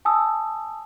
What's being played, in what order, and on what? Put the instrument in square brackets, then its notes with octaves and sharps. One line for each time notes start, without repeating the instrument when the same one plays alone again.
[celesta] G#5 A5 D#6 E6